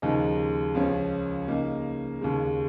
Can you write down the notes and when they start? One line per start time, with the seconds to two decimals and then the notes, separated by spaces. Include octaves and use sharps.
0.02 D#2 C#3 F3 G#3 D#4
0.75 C#2 C#3 F3 C#4
1.48 C#3 A#3 D#4
2.21 D#2 C#3 G#3